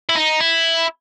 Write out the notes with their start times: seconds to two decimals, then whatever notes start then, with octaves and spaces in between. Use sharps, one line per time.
0.09 E4
0.15 D#4
0.40 E4